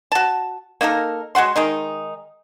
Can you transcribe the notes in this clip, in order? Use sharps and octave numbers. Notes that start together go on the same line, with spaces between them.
F#4 A5
A#3 D#4 A4 A#4
G#3 F#4 F#5 C6
D#3 G#3 D#4